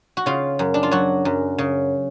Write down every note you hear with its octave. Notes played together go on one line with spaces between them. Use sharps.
F#4
C#3 F4
F#2
D4
F4
F#3 F#4
F#2
C#3